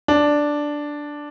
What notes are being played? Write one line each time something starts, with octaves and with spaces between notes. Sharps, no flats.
D4